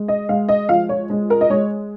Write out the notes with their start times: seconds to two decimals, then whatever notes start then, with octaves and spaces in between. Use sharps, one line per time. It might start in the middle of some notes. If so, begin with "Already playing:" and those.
Already playing: G#3
0.08 D#5
0.29 G#3 F5
0.49 D#5
0.69 F3 F5
0.89 C#5
1.10 G#3
1.30 A#4
1.41 D#5
1.50 G#3 C#5